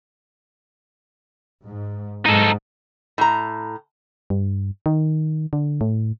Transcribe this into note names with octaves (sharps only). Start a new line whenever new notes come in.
G#2
G#2 D#4 A4
A2 A#5
G2
D#3
D3
A2